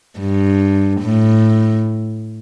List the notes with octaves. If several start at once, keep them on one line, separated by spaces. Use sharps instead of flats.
G2
A2